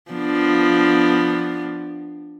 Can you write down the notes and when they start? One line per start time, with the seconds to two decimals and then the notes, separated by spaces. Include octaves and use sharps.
0.11 F3 B3 D4